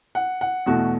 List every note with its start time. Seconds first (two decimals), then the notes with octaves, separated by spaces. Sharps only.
0.15 F#5
0.41 F#5
0.66 E2 B2 A3 F#4